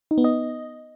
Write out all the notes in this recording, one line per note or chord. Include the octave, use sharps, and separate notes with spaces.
D#4
B3
D#5